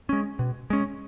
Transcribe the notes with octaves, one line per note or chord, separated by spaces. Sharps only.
G#3 C#4
B2
G#3 C#4